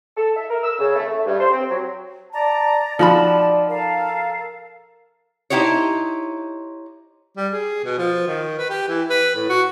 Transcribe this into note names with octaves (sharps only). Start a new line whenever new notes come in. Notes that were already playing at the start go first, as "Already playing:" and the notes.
A4
E5
A#4
E6
C#3
A3
A3
G2
C5
C4
F#3
D5 A5 A#5
F3 D#4 F#4 D5 A5 B5
A4 A#4 F5
D#4 E4 G4 C5 C#5
G3
G#4
B2
F3
D#3
B4
G4
E3
B4
A2
F#4